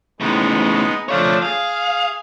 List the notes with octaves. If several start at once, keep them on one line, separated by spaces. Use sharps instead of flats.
A2 C#3 G#3 B3 D#4
F3 A3 D4 C#5 F5
G#4 F5